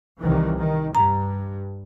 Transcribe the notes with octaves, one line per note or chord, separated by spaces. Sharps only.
C2 D#3 E3
D#3
G2 A#5